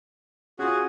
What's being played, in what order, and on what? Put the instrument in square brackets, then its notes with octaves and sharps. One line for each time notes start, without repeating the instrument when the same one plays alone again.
[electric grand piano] C#4 F4 [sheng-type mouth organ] F#4 G#4 F#5